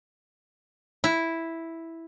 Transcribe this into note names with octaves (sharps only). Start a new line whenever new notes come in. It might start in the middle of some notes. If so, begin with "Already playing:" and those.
E4